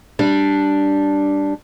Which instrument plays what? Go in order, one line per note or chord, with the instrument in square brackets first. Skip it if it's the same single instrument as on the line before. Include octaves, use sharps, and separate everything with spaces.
[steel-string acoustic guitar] G3 D4